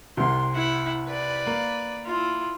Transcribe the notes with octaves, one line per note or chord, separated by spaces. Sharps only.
C2 C3 C6
E4 F#5
B4 D5
A#3
E4 F4